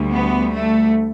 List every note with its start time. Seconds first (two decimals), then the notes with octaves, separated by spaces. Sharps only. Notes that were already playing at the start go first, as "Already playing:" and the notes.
Already playing: D2 D3 G3
0.11 B3
0.52 A3